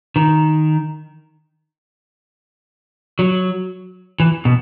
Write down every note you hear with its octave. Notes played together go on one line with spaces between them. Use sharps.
D#3
F#3
E3
B2